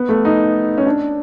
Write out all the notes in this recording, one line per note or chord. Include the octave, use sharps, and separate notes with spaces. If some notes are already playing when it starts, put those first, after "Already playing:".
Already playing: B3
A3
D#4
C#4
D4